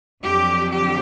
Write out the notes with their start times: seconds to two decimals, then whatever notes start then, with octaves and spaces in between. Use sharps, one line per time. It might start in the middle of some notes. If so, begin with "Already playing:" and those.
0.23 F2 D3 F#3 G4
0.72 G4